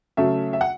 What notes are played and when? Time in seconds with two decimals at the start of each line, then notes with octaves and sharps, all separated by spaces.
0.17 C#3 F#3 A3 C#4 E5
0.53 E5
0.61 F#5